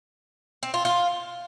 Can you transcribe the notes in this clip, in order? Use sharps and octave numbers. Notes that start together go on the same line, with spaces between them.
C4
F4
F4